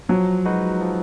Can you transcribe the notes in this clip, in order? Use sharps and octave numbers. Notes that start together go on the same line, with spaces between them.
F3 F#3
G#3 D#4 F#4 B4
F3